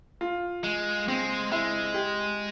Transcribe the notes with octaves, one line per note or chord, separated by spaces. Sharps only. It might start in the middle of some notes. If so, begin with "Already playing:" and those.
F4
G#3
G#3 C4
G#3 E4
G4